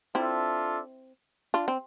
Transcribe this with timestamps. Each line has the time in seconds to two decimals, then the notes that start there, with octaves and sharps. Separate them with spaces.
0.15 C4 D4 E4 F4 A4 E5
1.54 D4 F4
1.68 C4